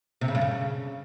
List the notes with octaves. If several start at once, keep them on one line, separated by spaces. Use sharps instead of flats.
C3
C#3
G2
C#3